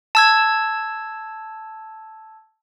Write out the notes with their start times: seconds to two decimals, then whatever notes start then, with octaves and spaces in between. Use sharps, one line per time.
0.15 A5 E6 G#6